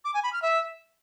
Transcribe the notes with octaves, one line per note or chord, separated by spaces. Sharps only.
D6
G#5
B5
F6
E5